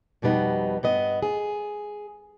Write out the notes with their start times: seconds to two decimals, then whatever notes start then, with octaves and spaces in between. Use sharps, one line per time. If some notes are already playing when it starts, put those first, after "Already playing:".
0.22 F2 B2 G3 B3 D#4
0.83 G2 B3 D#5
1.22 G#4